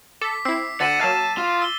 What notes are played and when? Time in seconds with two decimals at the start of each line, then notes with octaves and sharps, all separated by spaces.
0.21 A4 D6 B6
0.45 C4 E4 E6 C7
0.80 D2 D3 F#5 A6 D#7 E7
1.01 F#3 A#3 F5 A5
1.38 F4
1.62 E6 G7